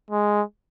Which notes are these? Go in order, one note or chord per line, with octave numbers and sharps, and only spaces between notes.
G#3